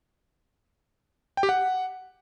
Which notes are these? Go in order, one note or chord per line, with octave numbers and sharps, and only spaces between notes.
G5
G4
F#5